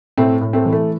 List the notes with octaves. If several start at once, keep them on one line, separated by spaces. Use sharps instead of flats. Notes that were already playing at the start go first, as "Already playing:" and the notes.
A2 A3 C4
A2
A3 C4
E3
A3